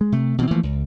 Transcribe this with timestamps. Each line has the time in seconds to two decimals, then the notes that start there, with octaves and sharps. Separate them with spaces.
0.01 G#3
0.12 C3 A3
0.38 B2 E3 A#3 C4
0.51 E3 F3 A3 A#3
0.63 C#2